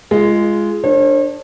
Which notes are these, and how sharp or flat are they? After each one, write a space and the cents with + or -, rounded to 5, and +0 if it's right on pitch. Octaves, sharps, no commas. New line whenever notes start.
G#3 +0 F4 -25
D4 +5 A#4 -15 C#5 -45